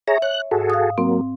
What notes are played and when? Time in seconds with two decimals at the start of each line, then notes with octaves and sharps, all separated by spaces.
0.08 G#4 C#5 E5 A#5
0.22 C#5 F#6
0.51 G#2 F#4 G#4 A4
0.70 F5 D#6
0.98 F#3 A#3 C4